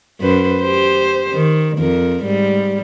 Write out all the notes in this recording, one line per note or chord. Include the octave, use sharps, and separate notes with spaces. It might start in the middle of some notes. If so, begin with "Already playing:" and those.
F#2 B4 C5
G4 C5
D#3
F2 A#4
G#2 G3